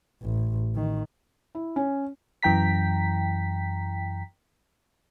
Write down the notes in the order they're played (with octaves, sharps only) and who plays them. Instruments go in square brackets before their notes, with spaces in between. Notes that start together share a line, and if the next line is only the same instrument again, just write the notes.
[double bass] A1
D#3
[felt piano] E4
C#4
[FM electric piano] F#2 E3 G5 A#5 B6